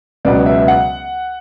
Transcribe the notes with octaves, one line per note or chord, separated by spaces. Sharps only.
C#2 B2 F#3 B3 D5
E5
F#5